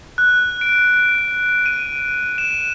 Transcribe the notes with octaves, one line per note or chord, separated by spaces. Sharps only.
F#6
D7
D#7
E7